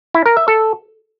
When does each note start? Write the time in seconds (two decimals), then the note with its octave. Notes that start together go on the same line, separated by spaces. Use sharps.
0.14 E4
0.26 A#4
0.37 E5
0.48 A4